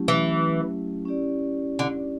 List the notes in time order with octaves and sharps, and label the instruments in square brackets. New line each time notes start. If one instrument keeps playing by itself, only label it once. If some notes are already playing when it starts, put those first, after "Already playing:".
Already playing: [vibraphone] F#3 A3 C#4 E4 G4
[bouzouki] E3
[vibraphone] C#4 E4 G4 D5
[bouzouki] D3